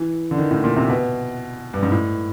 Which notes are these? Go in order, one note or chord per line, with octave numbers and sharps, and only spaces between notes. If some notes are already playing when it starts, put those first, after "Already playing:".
Already playing: E3
D3
D#3
A2
A#2
C3
B2
G2
G#2
A2